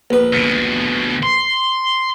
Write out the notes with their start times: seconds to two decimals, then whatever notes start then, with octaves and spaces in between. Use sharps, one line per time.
0.10 A#1 B4
0.33 D2 B2
1.23 C6